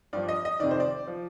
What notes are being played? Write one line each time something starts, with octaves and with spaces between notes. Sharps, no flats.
G2 F3 D5
D#5
D#5
F2 C3 D#3 D5
C5
D5
F3